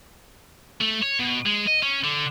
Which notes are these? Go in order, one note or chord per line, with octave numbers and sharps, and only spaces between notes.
A3
C#5
B2
G#3
D#5
C#4
D3